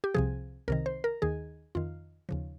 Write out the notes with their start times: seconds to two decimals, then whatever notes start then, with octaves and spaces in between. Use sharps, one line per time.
0.04 G4
0.15 C2 C3 F3 G#4
0.68 C2 C3 D#3 A#4
0.86 C5
1.04 A#4
1.22 D#2 D#3 G#4
1.75 F2 D#3 F4
2.29 D#2 C#3 F3